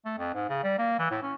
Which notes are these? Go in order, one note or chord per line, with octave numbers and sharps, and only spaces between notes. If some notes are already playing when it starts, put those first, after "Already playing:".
A3
F2
G#2
C#3
G3
A#3
E3
A2
C#4